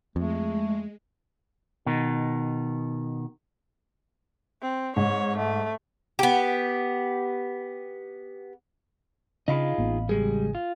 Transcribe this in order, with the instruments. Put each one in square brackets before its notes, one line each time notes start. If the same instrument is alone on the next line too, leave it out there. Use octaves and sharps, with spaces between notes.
[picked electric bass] F2 [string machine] G#3 [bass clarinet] A3
[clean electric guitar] B2 D#3
[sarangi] C4
[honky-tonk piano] G#2 [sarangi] C#5
[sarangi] A3
[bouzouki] B3 G4
[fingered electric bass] C#3 D4 [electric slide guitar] D#4 F4 G#4 [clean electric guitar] D#5 F5 B5
[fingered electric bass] A1 A#3 B3
[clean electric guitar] C#2 G#3 G#4 [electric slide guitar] G3
[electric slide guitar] F4